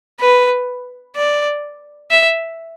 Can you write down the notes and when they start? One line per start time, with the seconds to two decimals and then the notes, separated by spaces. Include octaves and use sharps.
0.20 B4
1.16 D5
2.11 E5